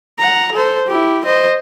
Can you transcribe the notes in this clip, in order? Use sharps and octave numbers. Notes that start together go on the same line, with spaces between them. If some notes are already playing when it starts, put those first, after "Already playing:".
F#5 A#5
A4 C5
E4 G4
C5 D#5